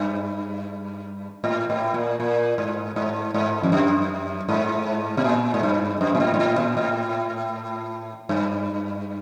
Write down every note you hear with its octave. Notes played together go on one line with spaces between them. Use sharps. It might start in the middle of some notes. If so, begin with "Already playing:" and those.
Already playing: G2
A2
A2
A#2
A#2
G#2
G#2
G#2
F2
F#2
G#2
B2
A#2
G#2
G2
F#2
A#2
A2
G#2
A2
A#2
A2
G2